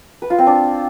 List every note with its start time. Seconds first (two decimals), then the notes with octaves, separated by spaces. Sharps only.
0.22 B4
0.30 F4
0.39 C4
0.47 D4